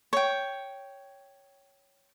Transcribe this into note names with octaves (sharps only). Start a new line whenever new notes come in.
C#5 G5